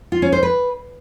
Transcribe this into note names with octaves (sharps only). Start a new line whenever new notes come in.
F4
C#4
C5
B4